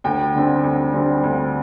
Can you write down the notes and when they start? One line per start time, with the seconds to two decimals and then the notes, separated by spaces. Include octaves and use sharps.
0.04 D2 G5
0.34 D3 G3 C4
0.63 D2
0.93 D3 G3 C4
1.23 D2